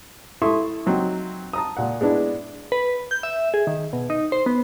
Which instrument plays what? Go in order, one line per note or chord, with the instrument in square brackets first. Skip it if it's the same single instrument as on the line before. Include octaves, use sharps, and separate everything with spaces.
[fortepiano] E4 A4 E5 C6 C#6 D#6
F#3 C4 D#4
A5 A#5 D#6
A#2 F#5
G#3 B3 D4 E4
[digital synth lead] B4
G6
E5
G#4
D#3
B2
D#4
C5
B3